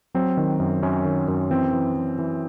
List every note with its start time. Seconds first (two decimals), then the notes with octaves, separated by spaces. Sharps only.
0.14 F#3 C4
0.37 D#3
0.60 F#2
0.83 F#2 C#4
1.05 D#3
1.28 F#2
1.50 E3 C4
1.73 E3
1.96 E3
2.19 E3